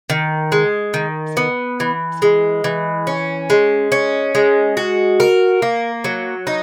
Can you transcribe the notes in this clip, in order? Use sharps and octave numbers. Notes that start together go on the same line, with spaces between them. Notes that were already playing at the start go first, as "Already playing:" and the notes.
D#3
G#3
D#3
B3
E3
G#3
E3
C#4
G#3
C#4
G#3
F#4
A#4
A#3
F#3
D#4